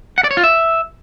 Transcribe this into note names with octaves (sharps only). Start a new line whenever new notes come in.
F#5
D5
C#5
F4
E5